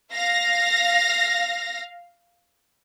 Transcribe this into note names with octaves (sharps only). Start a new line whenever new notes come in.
F5 A#6